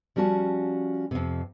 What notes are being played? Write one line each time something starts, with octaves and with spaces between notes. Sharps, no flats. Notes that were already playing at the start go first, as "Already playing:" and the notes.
F3 G3 C#4 F#4 A5
F2 C3